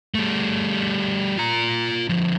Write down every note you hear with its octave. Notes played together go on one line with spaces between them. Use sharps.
G3 A3
F4 A#5
D3 F3